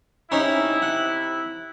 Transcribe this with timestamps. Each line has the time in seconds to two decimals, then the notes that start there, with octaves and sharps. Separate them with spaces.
0.32 C3 C#4 D#4 E4
0.82 F#5